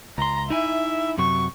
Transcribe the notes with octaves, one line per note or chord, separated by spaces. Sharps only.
C#2 A#5 C6
D#4 E4 E5 G#5
F#2 C3 F#3 C#6